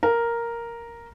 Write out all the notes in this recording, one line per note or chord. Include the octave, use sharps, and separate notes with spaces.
A#4